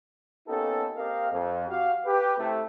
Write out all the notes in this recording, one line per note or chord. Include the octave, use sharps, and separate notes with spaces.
A#3 B3 C#4 D#4 G4 A4
A#3 C4 G4 A#4 D#5 F5
F2
F#4 G4 F5
G4 B4
C3 A3 E4